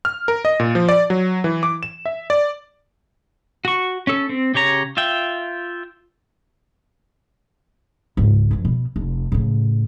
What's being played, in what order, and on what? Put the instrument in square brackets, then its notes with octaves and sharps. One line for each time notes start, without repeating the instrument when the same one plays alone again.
[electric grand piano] F6
A#4
D#5
A#2
F3
D5
F#3
E3
D6
E7
E5
D5
[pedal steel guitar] F#4 C#6
C#4 A4
C4
C#3 G4 C#5 A#5
F4 E5 G5
[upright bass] C#2 G#2
F#2 F3
B2
F1
A2 C#3